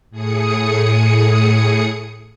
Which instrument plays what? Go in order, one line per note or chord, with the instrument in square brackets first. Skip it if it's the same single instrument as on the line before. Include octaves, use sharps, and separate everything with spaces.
[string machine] A2 G#4 D#6 C#7